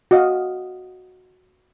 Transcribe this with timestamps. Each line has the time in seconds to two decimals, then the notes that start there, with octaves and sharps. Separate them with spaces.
0.11 F#4 D#5 F5